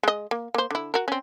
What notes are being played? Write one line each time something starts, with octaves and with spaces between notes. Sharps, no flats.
G#3 D#5
A#3
A#3 C5
D3 E4
F#4 A#4
C4 C#4